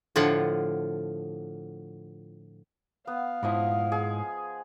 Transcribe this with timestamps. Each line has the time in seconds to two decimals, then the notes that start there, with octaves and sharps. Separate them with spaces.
0.16 A2 D3 F3 F4 F#5
3.07 B3 F5
3.43 G#2 F3 E4 D#5 B5
3.92 G#4